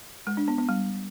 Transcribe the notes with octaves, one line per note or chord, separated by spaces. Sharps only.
G#3
D4
B3
B3
G3